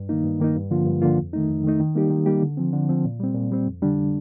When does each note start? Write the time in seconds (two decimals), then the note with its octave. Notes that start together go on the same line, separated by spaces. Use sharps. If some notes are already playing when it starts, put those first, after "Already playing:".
Already playing: G2
0.09 D#3 A#3 D#4
0.24 G2
0.40 D#3 A#3 D#4
0.55 G2
0.71 D3 F3 A#3 F4
0.86 G2
1.02 D3 F3 A#3 F4
1.18 F2
1.33 D#3 A3 D#4
1.49 F2
1.64 D#3 A3 D#4
1.80 D#3
1.95 G3 A#3 D#4 G4
2.10 D#3
2.26 G3 A#3 D#4 G4
2.42 D3
2.57 F3 C4
2.73 D3
2.89 F3 C4
3.04 A#2
3.20 G3 C4
3.35 A#2
3.51 G3 C4
3.67 F2
3.82 D3 G3 D4